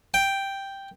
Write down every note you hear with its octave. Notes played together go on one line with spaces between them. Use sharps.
G5